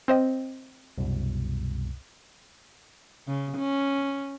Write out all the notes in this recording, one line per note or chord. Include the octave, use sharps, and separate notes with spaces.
C4 C5 D#5
C2 F#2 B2
C#3
C#4